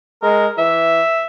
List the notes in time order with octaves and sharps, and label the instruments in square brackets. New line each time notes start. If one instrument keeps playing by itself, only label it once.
[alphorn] G#3 [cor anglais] A#4
[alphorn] E3 [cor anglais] E5